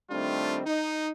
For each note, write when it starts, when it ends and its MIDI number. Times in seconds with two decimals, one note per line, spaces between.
0.11 0.61 51
0.11 0.61 55
0.11 0.61 57
0.11 0.61 60
0.11 0.61 62
0.11 0.61 65
0.66 1.10 63